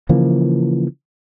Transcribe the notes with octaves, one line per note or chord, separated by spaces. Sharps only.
C#3 E3 F3 A#3